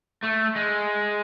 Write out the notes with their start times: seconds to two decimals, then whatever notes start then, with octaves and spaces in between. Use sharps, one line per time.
0.23 A3
0.55 G#3